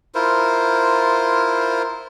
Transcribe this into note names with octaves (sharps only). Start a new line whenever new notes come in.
E4 F4 A#4 C5